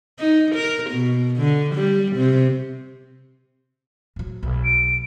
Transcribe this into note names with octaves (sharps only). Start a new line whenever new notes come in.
D#4
A#4
B2
D3
G3
C3
A#1 F#3
B1
D7